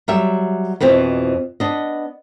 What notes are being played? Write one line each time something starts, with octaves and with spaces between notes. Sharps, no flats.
F#3 G3 E5
F2 B2 E3 C4
B3 D4 D#5